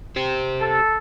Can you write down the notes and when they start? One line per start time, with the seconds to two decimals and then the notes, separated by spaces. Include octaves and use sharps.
0.16 G4 C5
0.61 A4